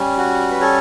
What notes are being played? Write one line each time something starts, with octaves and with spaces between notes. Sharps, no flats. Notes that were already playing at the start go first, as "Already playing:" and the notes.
Already playing: G3 C#4
F#4
B4
A4 C#5